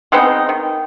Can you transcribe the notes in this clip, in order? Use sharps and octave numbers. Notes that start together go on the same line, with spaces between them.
G#3 B3 C4 D#4
D#3